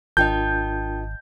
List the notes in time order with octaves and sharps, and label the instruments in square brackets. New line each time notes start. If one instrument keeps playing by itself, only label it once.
[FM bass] G#1 [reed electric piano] D4 F4 A#4 [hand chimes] D#5 G5 A5 [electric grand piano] G6